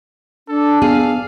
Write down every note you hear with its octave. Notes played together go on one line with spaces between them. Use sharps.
D4 A4
B3 G#4 F5